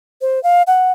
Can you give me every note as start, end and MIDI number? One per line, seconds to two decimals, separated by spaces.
0.21 0.42 72
0.43 0.62 77
0.67 0.92 78